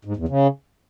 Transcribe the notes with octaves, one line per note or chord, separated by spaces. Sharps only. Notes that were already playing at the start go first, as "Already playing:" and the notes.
G#2
E2
C#3